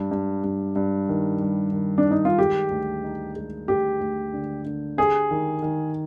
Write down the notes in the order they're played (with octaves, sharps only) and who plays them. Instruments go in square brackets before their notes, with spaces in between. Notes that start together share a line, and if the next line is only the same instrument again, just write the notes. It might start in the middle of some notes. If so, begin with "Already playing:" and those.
Already playing: [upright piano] G2
G2
G2
G2
D#3
G3
D#3
[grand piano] D4
[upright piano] D#3
[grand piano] D#4
F4
[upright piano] G#3 [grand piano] G4
[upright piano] D2
D#4
G#3
[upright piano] D2 [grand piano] G4
[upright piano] D2
D3
D3
[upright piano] G4 [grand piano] G#4
[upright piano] D#3
D#3